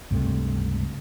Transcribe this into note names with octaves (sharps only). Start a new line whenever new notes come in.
C#2 G2 C3 A3